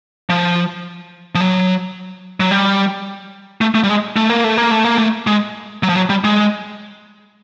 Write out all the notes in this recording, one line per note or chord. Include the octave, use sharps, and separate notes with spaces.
F3
F3
F#3
F#3
G3
A3
A3
G3
G#3
A3
A#3
A3
A#3
A3
A#3
A3
G#3
F#3
F3
F#3
G3
G#3